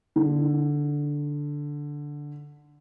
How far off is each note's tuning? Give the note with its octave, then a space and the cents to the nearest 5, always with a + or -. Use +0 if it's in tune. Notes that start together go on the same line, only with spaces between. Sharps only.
D3 -5